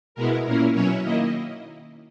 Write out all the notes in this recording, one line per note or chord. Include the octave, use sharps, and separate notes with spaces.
B2 G#3 B3 E4 A#4
A#2 A#3 C#4 E4 A#4
B2 F#3 C#4 E4 C#5
D#3 A#3 E4 D#5